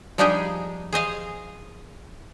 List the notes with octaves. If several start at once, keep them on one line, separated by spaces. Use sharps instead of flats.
F3 G3 D4 D#4 G4 G#4
G#4 C5 D#5 F5